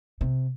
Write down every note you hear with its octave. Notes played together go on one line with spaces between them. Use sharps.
C3